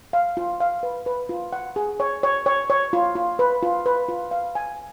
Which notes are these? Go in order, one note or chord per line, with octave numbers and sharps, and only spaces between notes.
F5
F4
F5
B4
B4
F4
F#5
G#4
C#5
C#5
C#5
C#5
F4
F4
B4
F4
B4
F4
F5
G#5